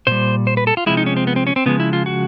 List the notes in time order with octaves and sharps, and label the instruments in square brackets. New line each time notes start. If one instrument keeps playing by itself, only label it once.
[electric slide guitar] A#2 G3 C5
C5
B4
A4
F4
C3 F3 G#3 E4
D#4
C#4
C4
B3
C4
C#4
C4
C#3 F3 G#3 B3
E4
F4
F#4